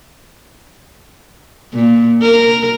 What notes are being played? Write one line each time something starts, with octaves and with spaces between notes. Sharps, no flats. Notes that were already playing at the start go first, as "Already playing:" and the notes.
A#2
A#4